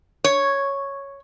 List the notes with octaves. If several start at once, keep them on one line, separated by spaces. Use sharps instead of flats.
C#5